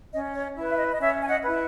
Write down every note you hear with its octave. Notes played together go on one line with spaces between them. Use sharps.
C#4 D#5
C#5
E4 B4
E5
D#5
D#5
C#4 C#5 E5
G#5
D#5 F#5
E4 B4